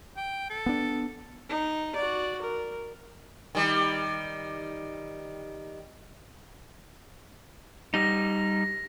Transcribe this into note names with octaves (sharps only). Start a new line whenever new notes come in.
G5
A4
B3 D4
D#4
F#4 D5
A#4
D#3 G3
G3 D#4 A#6